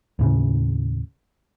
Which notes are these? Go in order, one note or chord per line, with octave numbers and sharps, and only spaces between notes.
D#2 A2 C#3